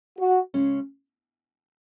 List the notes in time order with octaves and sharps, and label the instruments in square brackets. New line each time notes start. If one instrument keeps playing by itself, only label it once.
[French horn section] F#4
[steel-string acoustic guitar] C#3 G#3 C#4